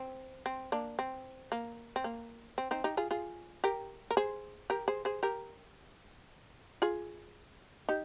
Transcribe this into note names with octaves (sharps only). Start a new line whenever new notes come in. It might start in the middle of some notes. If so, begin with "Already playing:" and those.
Already playing: C4
C4
A#3 D4
C4
A#3
C4
A#3
C4
C4 D#4
D#4 G4
F4 G#4
F4 G#4
G4 A#4
A#4
G#4 C5
G4 A#4
G#4 C5
G#4 C5
G4 A#4
F4 G#4
D#4 G4